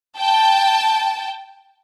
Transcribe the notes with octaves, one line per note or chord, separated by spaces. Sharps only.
G5 A5